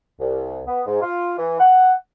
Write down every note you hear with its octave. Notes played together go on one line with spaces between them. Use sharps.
C2
B3
G#2
F4
E3
F#5